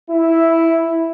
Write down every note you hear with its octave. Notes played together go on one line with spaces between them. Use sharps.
E4